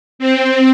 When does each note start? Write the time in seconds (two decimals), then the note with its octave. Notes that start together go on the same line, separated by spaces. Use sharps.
0.19 C4